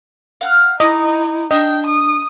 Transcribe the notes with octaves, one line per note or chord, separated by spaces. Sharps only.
F5 F#5 F6
D#4 E4 D#5 D6
D4 D#5 G5
D#6